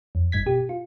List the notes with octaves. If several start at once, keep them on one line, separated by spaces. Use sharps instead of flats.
F2
G1 G2 G#6 B6
B2 G4
F4